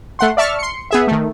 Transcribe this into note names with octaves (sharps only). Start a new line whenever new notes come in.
A3 F#5 C6
D5 E5 A5 C#6 F6
C6 C#7
B3 G#4 E5
D#3 A3